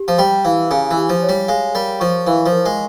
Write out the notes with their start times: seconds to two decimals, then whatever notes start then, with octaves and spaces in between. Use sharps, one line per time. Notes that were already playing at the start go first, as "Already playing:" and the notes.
Already playing: G4
0.08 F3
0.18 G3 G4
0.45 E3 F5
0.71 C#3 G#5
0.91 E3
0.97 G4
1.09 F3
1.23 C#5
1.29 G3
1.48 G#3 F5
1.75 G3 A#4
2.00 F3 C#6
2.27 E3 F5
2.46 F3
2.52 A#4
2.66 G#3